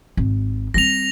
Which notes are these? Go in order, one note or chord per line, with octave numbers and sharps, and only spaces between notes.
G#1
G3 C4 A#6 F7